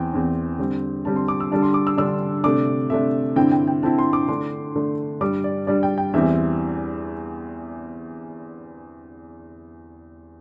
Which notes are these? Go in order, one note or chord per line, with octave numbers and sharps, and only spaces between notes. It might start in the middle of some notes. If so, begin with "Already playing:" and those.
Already playing: E2 E3 C4 G5
E2 E3 C4
D3 G3 C4
D3 G3 C4 A5
C6
D6
E6
D3 G3 D4 A5
C6
D6
E6
D3 G3 D4 E6
C3 A3 D4 D6
C3 A3 D4 E5
G2 D3 C4 E4 G5
G5
G5
G2 D3 C4 E4 A5
C6
D6
D3 A3 D4 C6
D3 A3 D4
G2 G3 D4 D6
D5
G2 G3 D4 D5
G5
G5
E2 E3 G3 C4 E5